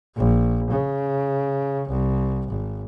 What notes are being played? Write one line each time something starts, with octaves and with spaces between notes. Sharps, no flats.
A#1
C#3
C2
G#1